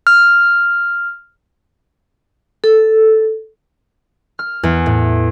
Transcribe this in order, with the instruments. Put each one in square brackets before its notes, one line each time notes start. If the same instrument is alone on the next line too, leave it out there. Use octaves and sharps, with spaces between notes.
[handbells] F6
[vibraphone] A4
[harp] F6
E2
A2